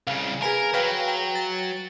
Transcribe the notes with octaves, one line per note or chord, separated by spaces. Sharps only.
C2 C#3 F5
G#4 A#4 B4 G#5
F#3 B4 F5 G5
G5
A6